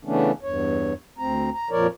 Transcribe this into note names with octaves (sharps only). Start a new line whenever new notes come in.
C#3 E3 A3 B3 C#4 D4
E2 G2 C#5
D2 C4 A#5
A#5
F2 A#2 F3 A#4 C#5 D5